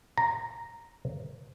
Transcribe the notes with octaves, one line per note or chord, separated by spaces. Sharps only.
A#5